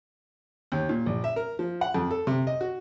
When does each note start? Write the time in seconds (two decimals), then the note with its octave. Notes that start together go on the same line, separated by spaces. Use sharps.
0.72 D#2
0.89 A#2
1.06 A#1
1.24 E5
1.36 A#4
1.59 F3
1.81 F#5
1.94 F2
2.11 A4
2.27 C3
2.47 D#5
2.61 F#4